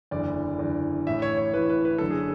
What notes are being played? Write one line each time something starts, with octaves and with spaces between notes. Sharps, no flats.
F#1 E2 D3 D5
F#1 E2 D3
A1 A2 E3 E5
C#5
C#5
A1 A2 E3 B4
B4
B4
F#1 F#2 D3 A4
G#4